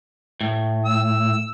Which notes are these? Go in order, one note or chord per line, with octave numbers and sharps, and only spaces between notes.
A2
E6